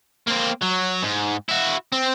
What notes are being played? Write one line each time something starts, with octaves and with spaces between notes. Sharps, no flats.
A#3 C4
F#3
G#2
E4 F#4
C4